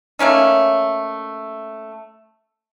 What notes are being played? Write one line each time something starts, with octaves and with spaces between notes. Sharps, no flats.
A3 A#3 C#4 D#4